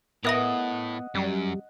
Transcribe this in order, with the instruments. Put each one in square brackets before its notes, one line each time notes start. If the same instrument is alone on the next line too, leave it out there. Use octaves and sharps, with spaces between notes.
[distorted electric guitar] A2 [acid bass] B3 [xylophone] A#4 E5 A#6 [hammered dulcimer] D#5 F#5
[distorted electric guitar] F#2 [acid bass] G3